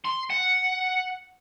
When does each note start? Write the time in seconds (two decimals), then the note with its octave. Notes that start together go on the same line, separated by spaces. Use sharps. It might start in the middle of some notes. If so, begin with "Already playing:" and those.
0.05 C6
0.30 F#5